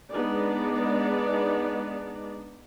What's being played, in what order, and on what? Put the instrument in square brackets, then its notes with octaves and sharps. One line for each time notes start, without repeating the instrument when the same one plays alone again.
[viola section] G#3 B3 D4 D#4 D5